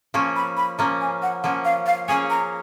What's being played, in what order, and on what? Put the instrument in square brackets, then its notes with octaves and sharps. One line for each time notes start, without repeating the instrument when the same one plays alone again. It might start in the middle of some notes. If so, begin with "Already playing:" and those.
[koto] F3 A#3 C#4 [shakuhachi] C#6
[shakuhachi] B5
B5
[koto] F3 A#3 C#4 [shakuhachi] A#5
[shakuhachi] G#5
F#5
[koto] F3 A#3 C#4 [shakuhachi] F#5
[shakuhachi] F5
F5
[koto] A#3 C#4 G#4 C#5 [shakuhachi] G#5
[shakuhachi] A#5